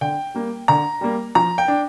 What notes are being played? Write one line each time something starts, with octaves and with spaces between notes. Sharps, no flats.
D3 G5
G3 A#3
D3 A#5
G3 A#3
F3 A#5
G5
D4